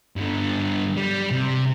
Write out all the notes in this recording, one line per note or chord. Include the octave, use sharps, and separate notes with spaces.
G2 D3
G3
C3